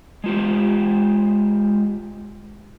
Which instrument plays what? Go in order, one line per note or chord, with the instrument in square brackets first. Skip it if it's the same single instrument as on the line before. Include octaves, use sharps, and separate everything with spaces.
[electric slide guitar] G#3 F4 G4